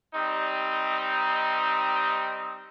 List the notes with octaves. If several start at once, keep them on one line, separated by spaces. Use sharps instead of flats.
G3 C4 D#4